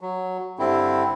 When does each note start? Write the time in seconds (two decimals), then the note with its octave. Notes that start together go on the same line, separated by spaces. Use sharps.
0.01 F#3
0.59 G2 D3 C4 E4